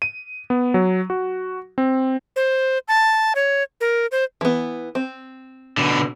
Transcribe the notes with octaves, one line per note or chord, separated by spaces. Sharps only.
D#7
B3
F#3
F#4
C4
C5
A5
C#5
A#4
C5
E3 B3
C4
B2 D3